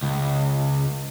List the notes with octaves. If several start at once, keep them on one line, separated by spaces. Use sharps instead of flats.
C#2